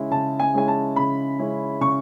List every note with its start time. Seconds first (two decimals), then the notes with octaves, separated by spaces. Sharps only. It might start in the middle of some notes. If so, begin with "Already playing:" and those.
Already playing: C#3 G#3 C#4 E4
0.11 C#3 A5
0.40 G#5
0.54 G#3 C#4 E4 G#5
0.68 A5
0.96 C#3 B5
1.39 G#3 C#4 E4
1.81 C#3 C#6